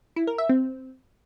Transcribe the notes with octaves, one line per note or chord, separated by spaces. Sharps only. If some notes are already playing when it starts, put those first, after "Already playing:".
E4
A#4
E5
C4